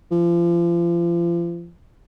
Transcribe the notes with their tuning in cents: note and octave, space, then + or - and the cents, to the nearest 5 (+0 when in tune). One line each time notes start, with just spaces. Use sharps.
F3 -35